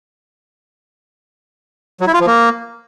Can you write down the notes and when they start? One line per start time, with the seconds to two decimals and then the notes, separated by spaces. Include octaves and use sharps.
2.00 F#3
2.07 E4
2.14 F4
2.20 F3
2.27 A#3